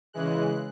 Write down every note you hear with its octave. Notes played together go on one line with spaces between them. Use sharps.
C#3 E3 G#3 F#6